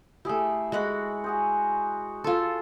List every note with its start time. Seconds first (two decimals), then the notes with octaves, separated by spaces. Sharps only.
0.25 A3 E4 G4 G#4 E5
0.72 G#3 E4 F#4 F#5 B5
1.24 F#4 G#4 C5
2.24 F4 A4 C6